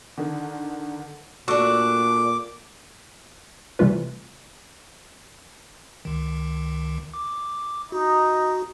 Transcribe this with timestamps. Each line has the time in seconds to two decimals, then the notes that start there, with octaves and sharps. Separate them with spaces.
0.18 D3 D#3
1.48 A#2 A3 D4 F#4 D6 E6
3.79 C3 E3 G3 A3 F4 B4
6.05 C#2 D#3
7.14 D6
7.92 D#4 F#4